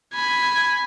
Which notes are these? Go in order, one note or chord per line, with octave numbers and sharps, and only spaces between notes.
G#5 B5